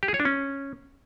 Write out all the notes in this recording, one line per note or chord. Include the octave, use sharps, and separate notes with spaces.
G4
G#4
C#5
D4
C#4